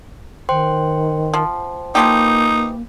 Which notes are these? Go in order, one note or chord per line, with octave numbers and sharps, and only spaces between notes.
D#3 C5 G5 C6
F3
E3 F3 A#3 D#4 G4